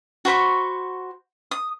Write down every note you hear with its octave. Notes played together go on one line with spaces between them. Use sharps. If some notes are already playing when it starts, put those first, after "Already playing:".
F#4 C5 B5 C#6
D#6